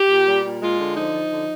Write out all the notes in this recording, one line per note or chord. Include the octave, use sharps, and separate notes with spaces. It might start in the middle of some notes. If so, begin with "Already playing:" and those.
Already playing: G4
A#2
G3
A#2
G#3 F4
D3
F3 D#4
F3
D3